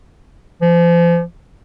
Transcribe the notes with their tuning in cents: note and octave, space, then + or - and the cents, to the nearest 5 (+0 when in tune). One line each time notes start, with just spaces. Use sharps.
F3 -35